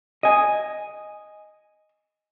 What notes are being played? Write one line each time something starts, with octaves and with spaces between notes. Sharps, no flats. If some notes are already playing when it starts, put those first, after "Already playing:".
D#5 G#5